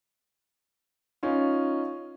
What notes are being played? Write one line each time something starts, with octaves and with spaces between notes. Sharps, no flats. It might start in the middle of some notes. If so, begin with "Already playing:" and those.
C#4 D#4 F4